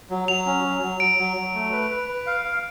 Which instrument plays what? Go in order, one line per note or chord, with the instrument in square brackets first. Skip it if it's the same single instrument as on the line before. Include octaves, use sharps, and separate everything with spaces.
[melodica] F#3
[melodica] F#3 [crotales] F7
[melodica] C#4
F#3
F#3
[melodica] F#3 [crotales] D7
[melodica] F#3
F#3
A3
B4
B4
B4
F5
F5